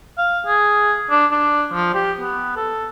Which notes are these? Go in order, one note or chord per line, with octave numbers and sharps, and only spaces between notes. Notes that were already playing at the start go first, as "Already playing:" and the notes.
F5
G#4
D4
D4
F3
G4
B3
A4